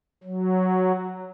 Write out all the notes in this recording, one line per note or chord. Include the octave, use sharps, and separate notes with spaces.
F#3